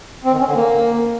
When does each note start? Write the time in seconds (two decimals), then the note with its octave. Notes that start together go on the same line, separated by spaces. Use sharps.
0.25 C4
0.32 D#3
0.39 C#4
0.47 D3
0.54 A#3